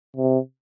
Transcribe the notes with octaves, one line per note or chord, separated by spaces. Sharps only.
C3